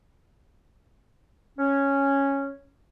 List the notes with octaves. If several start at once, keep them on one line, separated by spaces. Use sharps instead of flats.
C#4